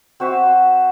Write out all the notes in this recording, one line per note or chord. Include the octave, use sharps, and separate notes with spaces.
C4 F#4 C5 E5